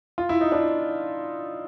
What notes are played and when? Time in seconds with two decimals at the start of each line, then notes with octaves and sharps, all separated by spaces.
0.18 F4
0.29 E4
0.41 D#4
0.52 D4 E4